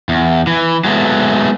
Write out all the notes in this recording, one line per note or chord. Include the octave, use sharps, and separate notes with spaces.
E2
E3
F#3 G#3 A3 B3